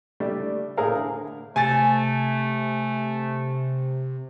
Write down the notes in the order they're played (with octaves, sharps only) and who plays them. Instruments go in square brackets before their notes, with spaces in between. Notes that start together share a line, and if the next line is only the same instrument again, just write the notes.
[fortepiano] G3 A3 D4
A2 E4 G#4 A#4 F5
D3
[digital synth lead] C3 [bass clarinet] A3 [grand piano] G#5 A6